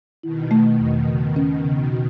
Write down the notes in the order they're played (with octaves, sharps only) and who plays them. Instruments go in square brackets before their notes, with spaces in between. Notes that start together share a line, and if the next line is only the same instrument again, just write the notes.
[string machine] B2 D#3 [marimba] E4
[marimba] A3
E2
C#3
C#4
C#3
F#4